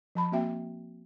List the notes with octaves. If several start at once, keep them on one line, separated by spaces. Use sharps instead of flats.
F3 A5 B5
A#3 C4 F#4 E5 G5